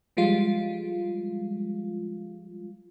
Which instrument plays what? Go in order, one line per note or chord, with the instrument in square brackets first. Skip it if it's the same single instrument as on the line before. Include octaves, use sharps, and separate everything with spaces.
[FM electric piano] F3 G3 G#3 F4